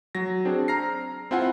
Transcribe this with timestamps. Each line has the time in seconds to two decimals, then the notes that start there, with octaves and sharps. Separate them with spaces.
0.15 F#3 A#6
0.45 C4 D4 G#4
0.68 A#5 F6 A#6 C7
1.31 C4 E4 F4 F#5 G#5